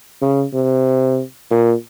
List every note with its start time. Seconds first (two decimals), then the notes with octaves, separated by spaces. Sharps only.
0.22 C#3
0.53 C3
1.51 A#2